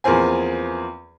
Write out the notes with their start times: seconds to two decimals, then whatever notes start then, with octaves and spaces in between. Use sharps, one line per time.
0.04 E2 F3 A#3 C4 G#5